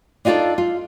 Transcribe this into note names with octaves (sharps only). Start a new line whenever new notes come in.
D4 D#4 F4 F#4 A4 D5
F4